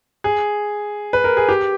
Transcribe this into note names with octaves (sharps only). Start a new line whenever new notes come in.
G#4
B4
A#4
G#4
G4